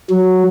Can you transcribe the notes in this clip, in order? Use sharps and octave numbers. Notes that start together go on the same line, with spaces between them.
F#3